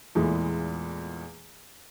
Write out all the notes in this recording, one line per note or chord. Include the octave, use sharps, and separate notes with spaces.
E2 A#2 E3 G#3 A3